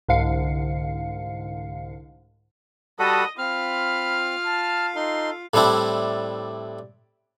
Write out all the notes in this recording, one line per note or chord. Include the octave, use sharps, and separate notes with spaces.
C2 G#2 D3 F5 C7 C#7
G3 F#4 A4 D#5 F#5 A5 B5 D#6
C4 F4 F5 B5 F6
A5
D#4 A4 C6
A2 G3 C4 D4 E4